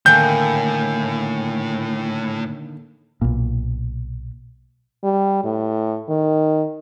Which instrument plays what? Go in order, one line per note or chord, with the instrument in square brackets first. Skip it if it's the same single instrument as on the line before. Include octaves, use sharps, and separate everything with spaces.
[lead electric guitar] A2 [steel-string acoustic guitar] D3 D#3 A#3 [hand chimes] G5 G#5 [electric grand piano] G6
[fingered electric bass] B1 A#2
[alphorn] G3
A2
D#3